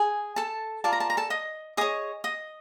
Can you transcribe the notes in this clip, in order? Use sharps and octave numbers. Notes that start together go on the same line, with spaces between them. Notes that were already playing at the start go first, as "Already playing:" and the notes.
Already playing: G#4 G#5
A4 A5
F4 A#4 D5 A5
A#5
A5
A#5
A4 A5
D#5 D#6
G#4 C#5 D#5 D#6
D#5 D#6